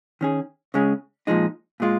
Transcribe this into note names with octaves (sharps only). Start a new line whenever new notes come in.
D#3 C#4 G#4
C#3 G#3 C#4 G#4
A#2 F3 G#3 D#4
A#2 G#3 F4